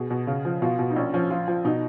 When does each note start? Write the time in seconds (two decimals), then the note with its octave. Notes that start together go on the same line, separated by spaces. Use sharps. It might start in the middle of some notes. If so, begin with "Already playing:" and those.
Already playing: B2 G#4
0.11 B2
0.27 C#3
0.45 F3
0.62 B2 F4
0.79 B2
0.91 D#4
0.96 A#1 C#4
1.14 F3 C#4
1.31 F3 F4
1.48 F3
1.65 B2 D#4